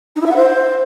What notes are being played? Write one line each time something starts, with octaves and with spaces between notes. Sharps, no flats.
D#4
E4
E5
F#5
C5